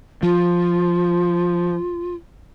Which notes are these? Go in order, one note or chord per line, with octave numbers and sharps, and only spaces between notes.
F3 F4